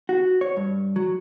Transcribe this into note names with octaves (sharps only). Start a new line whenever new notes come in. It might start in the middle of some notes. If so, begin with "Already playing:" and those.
F#4
C#5
G2
F#3